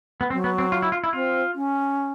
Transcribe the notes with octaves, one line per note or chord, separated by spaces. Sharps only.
B3
F#3 C4
B3
C4
F4
E4
F4
E4
C4 F4
C#4